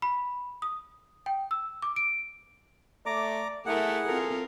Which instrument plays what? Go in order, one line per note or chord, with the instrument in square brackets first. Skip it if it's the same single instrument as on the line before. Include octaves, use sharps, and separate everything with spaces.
[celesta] B5
D#6
G5
E6
D6
D7
[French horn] A3 [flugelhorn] D5 [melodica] A#5 D6
[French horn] A3 [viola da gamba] E4 A#4 [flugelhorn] G#4 [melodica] F#5
[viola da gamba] C4 F4 A#4 [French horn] A4